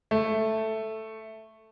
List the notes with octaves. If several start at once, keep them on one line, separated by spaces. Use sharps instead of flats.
A3